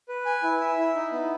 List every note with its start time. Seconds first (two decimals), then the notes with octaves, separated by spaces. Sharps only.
0.09 B4
0.25 G#5
0.43 E4
0.61 E5
0.77 E4
0.95 D#4
1.12 B3